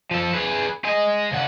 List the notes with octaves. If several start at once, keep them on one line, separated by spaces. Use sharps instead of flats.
F3 A4
G#4 B4
G#4 D#5
C#3 F#5